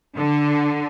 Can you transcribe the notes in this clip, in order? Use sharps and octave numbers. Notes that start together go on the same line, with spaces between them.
D3